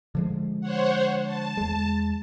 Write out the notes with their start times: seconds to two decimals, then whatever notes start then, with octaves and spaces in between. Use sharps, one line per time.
0.15 D3 F3 G#3
0.61 C5 C#5 F#5
1.24 A5
1.57 E2 G#3